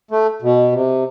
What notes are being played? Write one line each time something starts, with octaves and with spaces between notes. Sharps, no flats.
A3
B2
C3